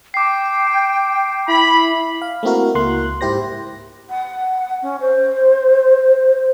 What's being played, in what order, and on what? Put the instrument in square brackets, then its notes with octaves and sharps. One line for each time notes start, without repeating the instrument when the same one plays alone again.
[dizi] G5 [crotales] D6 C7
[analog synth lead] E4 [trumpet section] B5
[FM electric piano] F5
A3 A#3 C4 E4 F#4 A#4
C#2 A#3 C6 F#6
G#2 E4 G4 C5 A#6
[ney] F#5
C#4
C5